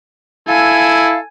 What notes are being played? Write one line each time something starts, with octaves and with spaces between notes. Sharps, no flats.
E4 A4 F5 G#5